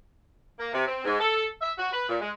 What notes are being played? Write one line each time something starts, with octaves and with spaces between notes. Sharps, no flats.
A#3
C3
C4
G#2
A4
E5
F#4
B4
A#2
G#3